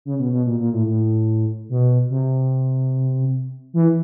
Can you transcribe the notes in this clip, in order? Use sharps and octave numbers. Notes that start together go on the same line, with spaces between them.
C#3
B2
B2
A#2
A#2
A2
A2
B2
C3
E3